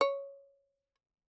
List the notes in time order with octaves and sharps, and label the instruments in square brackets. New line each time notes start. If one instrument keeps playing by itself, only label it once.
[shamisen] C#5